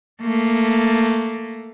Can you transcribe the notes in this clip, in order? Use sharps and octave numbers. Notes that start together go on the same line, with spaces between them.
A3 A#3